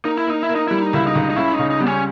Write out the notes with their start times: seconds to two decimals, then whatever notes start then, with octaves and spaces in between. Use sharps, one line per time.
0.04 A#3 D#4
0.17 E4
0.27 A#3 D#4
0.43 E4
0.49 A#3
0.55 D#4
0.68 G3 E4
0.82 D#4
0.93 C#2 E4
1.07 D#4
1.15 C#2
1.30 D#4
1.36 C#3 E4
1.53 D#4
1.59 C#3
1.71 D#4
1.80 G3 B3
1.87 C#4